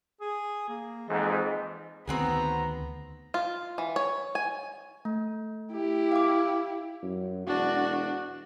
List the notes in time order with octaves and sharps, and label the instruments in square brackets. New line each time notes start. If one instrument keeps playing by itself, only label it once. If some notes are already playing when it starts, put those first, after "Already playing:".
[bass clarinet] G#4
A#3
[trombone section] F2 G#2 [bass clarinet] E3
[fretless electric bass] D2 D#3 [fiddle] B3 [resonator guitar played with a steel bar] C4 F#4 G#4 [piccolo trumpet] A#5
[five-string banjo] F4
E3
C#5
G#5
[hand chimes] A3
[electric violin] E4 G4
[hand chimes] F5 D6
[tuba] F#2
[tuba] E1 [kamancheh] D4 F#4